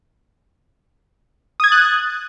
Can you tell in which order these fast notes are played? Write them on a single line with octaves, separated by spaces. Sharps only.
D#6 G#6 A6 F#6